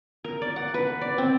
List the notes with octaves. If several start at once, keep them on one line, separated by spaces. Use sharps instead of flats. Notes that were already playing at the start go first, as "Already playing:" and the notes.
A#4
D5
F#5
B4
D5
C4